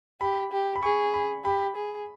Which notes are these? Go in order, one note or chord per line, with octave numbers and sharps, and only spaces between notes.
G4 B5
G4
B5
G#4 C#6
B5
G4 B5
G#4